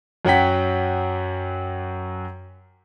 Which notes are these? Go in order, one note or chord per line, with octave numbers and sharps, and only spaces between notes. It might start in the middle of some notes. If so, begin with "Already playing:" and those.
F#2 F#3 F#5 G5 B6